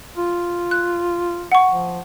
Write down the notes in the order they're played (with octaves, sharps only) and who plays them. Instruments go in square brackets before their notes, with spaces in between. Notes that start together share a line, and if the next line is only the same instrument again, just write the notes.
[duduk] F4
[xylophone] F#6
F#5 C#6
[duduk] F3